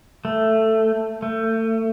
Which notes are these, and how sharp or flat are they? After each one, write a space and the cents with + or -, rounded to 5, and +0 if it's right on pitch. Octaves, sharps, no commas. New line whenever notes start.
A3 +10
A3 +30